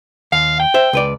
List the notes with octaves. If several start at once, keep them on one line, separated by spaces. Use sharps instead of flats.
D#2 F5
G5
C5 E5
C#2 B4 D5